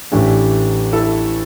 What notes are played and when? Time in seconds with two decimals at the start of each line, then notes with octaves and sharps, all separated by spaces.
0.12 A1 A2 E3 D4 G4
0.93 E4 A4